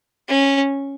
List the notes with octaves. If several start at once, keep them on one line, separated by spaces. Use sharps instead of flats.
C#4